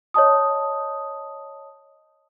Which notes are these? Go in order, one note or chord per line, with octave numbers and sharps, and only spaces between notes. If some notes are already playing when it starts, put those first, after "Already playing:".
C#5 D#5 A5 D#6